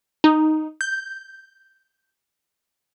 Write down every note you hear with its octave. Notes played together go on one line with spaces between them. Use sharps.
D#4
G6